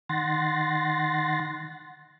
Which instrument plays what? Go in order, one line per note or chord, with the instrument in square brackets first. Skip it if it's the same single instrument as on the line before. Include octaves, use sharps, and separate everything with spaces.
[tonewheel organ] D#3 F#5 C6 A6 A#6